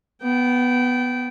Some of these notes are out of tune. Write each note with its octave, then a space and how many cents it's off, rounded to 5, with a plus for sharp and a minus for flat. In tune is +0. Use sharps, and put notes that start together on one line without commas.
B3 +0 G5 -20